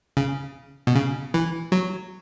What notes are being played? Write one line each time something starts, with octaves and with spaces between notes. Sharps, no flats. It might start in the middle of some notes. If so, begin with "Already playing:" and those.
C#3
B2
C#3
E3
F#3